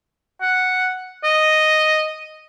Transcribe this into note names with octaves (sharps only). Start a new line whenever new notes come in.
F#5
D#5